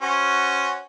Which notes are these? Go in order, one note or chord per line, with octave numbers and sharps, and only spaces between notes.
C#4 F#4 C5